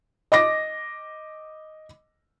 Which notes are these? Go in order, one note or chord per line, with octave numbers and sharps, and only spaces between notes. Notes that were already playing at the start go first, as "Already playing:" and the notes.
D#5 D6 A#6